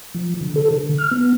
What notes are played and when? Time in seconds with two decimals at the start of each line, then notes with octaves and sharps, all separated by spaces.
0.14 F3
0.41 D3
0.56 A4
0.71 D3
0.98 F6
1.11 B3